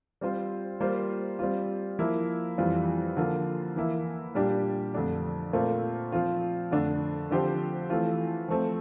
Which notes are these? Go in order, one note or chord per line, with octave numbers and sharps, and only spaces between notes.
G3 C4 F4 C5
G3 A#3 F4 C5
G3 C4 F4
F3 A#3 E4
F2 E3 G3 C4 F4
D3 F3 A#3 F4
E3 A#3 E4
A#2 G3 D4 G4
F2 D3 A3 D4
A#2 A3 C4 F4 A#4
F3 C4 F4
F2 D3 A3 D4
D3 F3 C4 G4 C5
E3 A3 C4 F4
F3 A3 C4